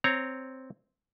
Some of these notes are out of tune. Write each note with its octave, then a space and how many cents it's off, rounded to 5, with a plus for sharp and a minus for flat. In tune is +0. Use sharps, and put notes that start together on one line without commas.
C4 +0 C#5 +0 A#5 +0